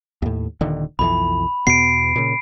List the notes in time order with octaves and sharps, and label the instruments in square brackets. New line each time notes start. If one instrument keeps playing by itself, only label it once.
[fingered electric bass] D#2 A2
D#1 D3 D#3
[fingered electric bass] B1 F2 E3 [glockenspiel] B5
[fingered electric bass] E2 B2 B3 [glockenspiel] C7 D7
[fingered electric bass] A#2 C#3